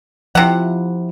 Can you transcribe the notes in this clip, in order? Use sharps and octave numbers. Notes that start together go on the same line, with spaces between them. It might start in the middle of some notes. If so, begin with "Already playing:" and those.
C3 F3 E4 F#5